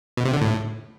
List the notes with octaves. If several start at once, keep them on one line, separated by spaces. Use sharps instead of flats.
B2
C3
D3
A2